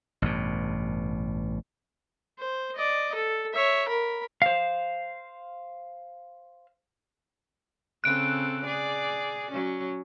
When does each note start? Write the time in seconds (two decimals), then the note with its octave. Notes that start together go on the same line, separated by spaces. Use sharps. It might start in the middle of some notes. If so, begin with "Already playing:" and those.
0.22 A1 G2 B2
2.38 C5
2.75 D5 D#5
3.15 A4
3.54 C#5 E5
3.88 A#4 B5
4.42 C5 F5
8.04 C#3 C4 A4 F#6 D7
8.65 G#4 D5
9.52 F#3 C#4